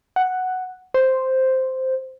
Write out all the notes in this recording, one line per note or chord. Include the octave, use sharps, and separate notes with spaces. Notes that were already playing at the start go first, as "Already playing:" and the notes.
F#5
C5